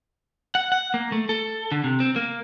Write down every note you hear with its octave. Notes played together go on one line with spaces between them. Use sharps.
F#5
F#5
A#3
A3
A4
D3
C3
C4
A#3